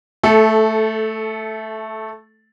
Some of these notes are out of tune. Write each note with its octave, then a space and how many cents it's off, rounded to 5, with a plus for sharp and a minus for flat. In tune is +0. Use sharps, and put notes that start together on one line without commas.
A3 +0 A4 -20